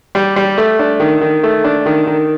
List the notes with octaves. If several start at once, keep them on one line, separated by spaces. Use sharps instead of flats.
G3
G3
A3
D4
D#3
D#3
A3
D4
D#3
D#3